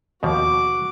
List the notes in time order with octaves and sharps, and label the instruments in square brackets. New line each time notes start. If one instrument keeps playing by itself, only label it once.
[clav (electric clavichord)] D#2 B2 F3 [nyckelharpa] F#4 D6